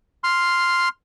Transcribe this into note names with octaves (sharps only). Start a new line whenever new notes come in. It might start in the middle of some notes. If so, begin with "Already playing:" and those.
C6 F6